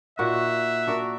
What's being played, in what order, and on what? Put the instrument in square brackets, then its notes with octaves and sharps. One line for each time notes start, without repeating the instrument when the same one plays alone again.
[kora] A#2 D#4 F#4 [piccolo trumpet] E5 [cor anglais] F#5
[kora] D4 F#4 A#4